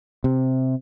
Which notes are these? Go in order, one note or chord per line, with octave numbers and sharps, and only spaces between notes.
C3